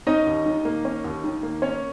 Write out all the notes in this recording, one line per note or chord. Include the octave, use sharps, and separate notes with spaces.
C#4 D#4 D#5
D#2
D#3
A#3
C#4
D#2
D#3
A#3
C#4 C#5